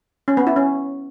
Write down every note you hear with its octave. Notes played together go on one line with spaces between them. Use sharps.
C#4
B3
E4
C#4